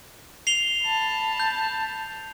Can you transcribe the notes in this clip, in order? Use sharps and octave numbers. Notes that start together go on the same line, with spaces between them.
C7 F7 G7
A5 B5
G6